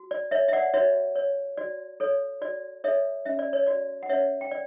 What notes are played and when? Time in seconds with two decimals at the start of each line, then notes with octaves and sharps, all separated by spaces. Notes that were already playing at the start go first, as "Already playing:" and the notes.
Already playing: F#4
0.11 D5
0.31 C#5 E5
0.48 E5
0.53 D5 F#5
0.74 F#4 C#5 E5
1.16 C#5
1.57 F#4 D5
2.00 A4 C#5
2.41 F#4 D5
2.84 A4 C#5 E5
3.26 C#4 E5
3.39 D5
3.53 C#5
3.67 F#4 C#5 D5
4.03 F#5
4.09 C#4 C#5 E5
4.41 G5
4.51 D5